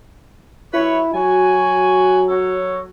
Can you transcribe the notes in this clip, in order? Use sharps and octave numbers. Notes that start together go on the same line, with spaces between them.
F#3 E4 B4 C#5
F#3 F#4 G#5
F#4 A4 C#5